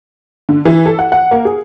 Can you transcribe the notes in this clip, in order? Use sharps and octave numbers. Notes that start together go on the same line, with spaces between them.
D3
E3
A4
F#5
F#5
A#3
G#4